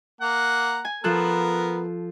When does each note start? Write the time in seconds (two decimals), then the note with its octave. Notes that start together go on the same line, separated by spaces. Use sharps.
0.21 A#3 F#5 A#5
0.85 G#5
1.04 F3 B3 A4 A#4 F#6